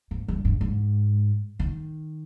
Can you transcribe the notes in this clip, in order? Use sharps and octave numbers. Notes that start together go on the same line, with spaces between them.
G#2
G2
G2
G#2
D#3